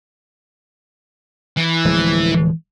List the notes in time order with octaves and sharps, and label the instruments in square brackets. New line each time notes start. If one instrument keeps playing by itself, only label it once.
[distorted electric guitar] E3
[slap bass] D1 F3 G#3